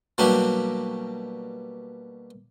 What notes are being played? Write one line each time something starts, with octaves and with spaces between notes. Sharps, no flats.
B2 F#3 G3 A#3 D4 G4